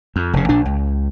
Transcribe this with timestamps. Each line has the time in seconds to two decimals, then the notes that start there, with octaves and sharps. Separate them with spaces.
0.16 F2
0.33 F1 C#3
0.49 A#1 D4
0.66 C#2